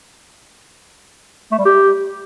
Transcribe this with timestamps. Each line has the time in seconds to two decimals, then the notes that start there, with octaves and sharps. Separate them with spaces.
1.52 A3
1.59 G3
1.65 G4